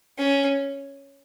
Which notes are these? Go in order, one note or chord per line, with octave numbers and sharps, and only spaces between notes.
C#4